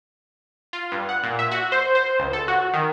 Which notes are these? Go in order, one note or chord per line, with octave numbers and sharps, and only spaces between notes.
F4
G2
F#5
A#2
E5
F#4
C5
C5
C#2
A4
F#4
D#3